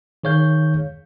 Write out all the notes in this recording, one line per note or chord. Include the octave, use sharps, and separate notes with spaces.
D#3 G#4 C#5 F5 G6